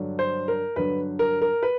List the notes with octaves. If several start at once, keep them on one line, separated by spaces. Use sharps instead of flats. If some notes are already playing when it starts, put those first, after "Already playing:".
Already playing: G2 D3 F#3
C5
A#4
G2 D3 F#3 B4
A#4
A#4
B4